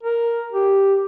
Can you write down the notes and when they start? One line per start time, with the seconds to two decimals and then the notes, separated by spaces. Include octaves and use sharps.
0.03 A#4
0.52 G4